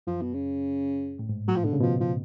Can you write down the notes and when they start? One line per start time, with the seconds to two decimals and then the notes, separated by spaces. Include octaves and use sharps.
0.07 F#2 F3
0.21 B2
0.34 C#3
1.19 A2
1.29 G#2
1.47 A2 F#3
1.56 F3
1.64 B2 D3
1.73 C#3
1.81 B2 F3
2.00 F3